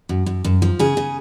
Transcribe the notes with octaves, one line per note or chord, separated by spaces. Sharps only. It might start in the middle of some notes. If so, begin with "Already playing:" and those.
F#2
F#2
F#2
F3
C#3 G#4
C#3